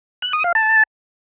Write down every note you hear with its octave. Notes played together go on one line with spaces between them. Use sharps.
F#6
D#6
F5
A5